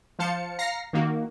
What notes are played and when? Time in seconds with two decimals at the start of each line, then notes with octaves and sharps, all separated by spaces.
0.19 F3 C5 F5 A5 C#7
0.59 F5 A#5 A#6 C7 C#7
0.93 D#3 A#3 D#4 F#4